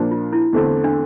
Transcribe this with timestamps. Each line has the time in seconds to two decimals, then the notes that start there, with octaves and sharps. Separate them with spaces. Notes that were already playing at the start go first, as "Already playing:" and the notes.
Already playing: A#2 F3 A#3 D4
0.11 F4
0.33 E4
0.53 E2 D3 A3 C4
0.84 D4